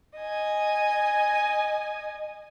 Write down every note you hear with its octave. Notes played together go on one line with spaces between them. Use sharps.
D#5 G#5